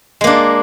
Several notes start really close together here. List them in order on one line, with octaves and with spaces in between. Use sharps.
G#3 A#3 D4